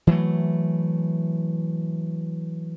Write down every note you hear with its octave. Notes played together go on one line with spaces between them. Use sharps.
E3 F#3 A3